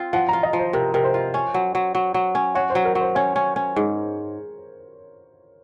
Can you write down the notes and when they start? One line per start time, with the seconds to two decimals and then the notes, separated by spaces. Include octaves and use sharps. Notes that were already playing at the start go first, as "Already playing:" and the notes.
Already playing: C4 F4
0.13 F3 F#5
0.29 A#5
0.33 F4
0.43 D#5
0.53 F3
0.59 C5
0.73 C3 A#4
0.94 C3 A#4
1.04 C5
1.14 F4
1.34 C#4
1.54 F#3
1.75 F#3
1.95 F#3
2.14 F#3
2.35 C#4
2.55 F#4 C#5
2.70 C5
2.75 F#3
2.85 A#4
2.95 F#3
3.00 C5
3.15 C#4 C#5
3.36 C#4
3.56 C#4
3.76 G#2